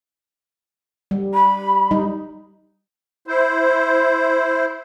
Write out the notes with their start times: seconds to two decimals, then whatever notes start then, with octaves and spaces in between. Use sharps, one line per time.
1.11 G3
1.34 B5
1.91 G3 D#4
3.27 E4 C5